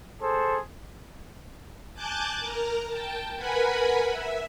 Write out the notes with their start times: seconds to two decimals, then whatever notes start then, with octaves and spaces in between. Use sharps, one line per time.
0.22 G#4 A4 C5
1.94 G#5 A5 D6 F#6 G6 A6
2.40 A#4 A#5
2.87 G5 A5
3.36 A#4 B4 F#5 G#5 B5
4.10 E5